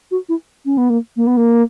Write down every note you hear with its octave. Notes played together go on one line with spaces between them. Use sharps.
F#4
E4
C#4
B3
A#3
A#3
B3
A#3